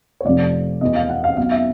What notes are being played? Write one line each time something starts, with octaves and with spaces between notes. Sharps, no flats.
C#5
F1 F2 C3 F3 D5
E2 B2 D#5
F5
F#5
F5
B1 B2 F5
E5